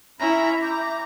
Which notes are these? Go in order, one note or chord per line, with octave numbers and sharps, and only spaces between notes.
C#4 E4 E5 A#5 B5
E5 A#5 D6 G6